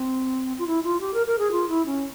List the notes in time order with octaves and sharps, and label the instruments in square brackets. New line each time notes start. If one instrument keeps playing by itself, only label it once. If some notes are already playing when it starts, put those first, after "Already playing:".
Already playing: [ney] C4
F4
E4
F4
G4
A#4
A#4
G#4
F4
E4
C#4